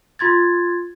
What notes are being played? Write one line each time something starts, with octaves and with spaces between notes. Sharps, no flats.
F4 C6 G#6 A6